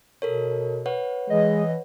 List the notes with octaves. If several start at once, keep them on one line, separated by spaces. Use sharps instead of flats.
B2 A4 A#4 C#5
B4 C#5 F#5
E3 G#3 D#5